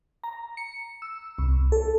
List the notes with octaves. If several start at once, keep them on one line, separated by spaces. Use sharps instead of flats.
A#5
C#7
E6
C2
A4